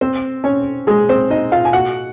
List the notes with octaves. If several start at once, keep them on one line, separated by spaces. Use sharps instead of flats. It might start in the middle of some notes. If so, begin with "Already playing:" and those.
C4 C5
C#4 C#5
G#3 G#4
C4 C5
D#4 D#5
F4 F5
G#5
F#4 F#5